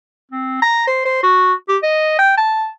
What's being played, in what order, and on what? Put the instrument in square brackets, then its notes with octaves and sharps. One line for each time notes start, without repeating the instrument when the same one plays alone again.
[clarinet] C4
A#5
C5
C5
F#4
G4
D#5
G5
A5